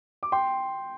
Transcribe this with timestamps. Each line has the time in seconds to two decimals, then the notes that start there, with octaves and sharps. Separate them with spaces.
0.23 D6
0.32 G5 C6